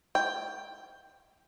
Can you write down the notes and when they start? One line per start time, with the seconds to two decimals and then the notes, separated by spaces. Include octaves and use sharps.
0.15 G5